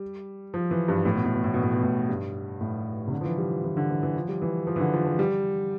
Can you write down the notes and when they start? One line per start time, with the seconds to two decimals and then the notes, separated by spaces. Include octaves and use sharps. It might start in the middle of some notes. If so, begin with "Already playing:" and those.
Already playing: G3
0.54 F3
0.71 E3
0.88 G2
1.05 A2
1.15 B2
1.25 A2
1.34 B2
1.44 A2
1.54 B2
1.63 A2
1.73 B2
1.83 A2
2.09 G2
2.61 A2
3.07 C3
3.12 D3
3.21 F3
3.24 E3
3.38 G3
3.51 F3
3.64 E3
3.77 D3
3.90 E3
4.03 E3
4.16 F3
4.28 G3
4.42 E3
4.67 F3
4.76 E3
4.80 D3
4.94 F3
5.06 F3
5.19 G3